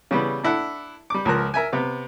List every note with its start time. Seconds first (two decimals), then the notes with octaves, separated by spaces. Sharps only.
0.11 C#3 E3 G3 B3
0.44 D4 E4 A4 F#5
1.10 G3 D6
1.25 C#2 F3 A#4 F#6
1.54 A#4 E5 G#5
1.73 C3 B3